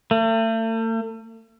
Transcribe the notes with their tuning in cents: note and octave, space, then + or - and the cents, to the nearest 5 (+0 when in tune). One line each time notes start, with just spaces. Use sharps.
A3 +40